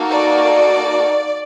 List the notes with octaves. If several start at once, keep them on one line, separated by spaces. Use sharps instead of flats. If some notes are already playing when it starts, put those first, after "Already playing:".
Already playing: A#3 D#4 F#4 A4
D5